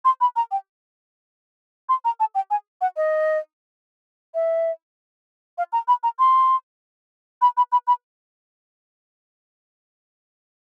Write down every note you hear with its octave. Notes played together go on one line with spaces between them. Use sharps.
C6
B5
A#5
G5
C6
A#5
A5
G5
G#5
F#5
D#5
E5
F5
A#5
B5
A#5
C6
B5
B5
B5
B5